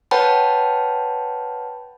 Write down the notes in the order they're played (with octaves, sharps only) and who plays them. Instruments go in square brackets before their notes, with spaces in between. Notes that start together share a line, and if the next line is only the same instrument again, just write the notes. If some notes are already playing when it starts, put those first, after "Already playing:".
[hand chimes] B4 C#5 F#5 G5 A5 B5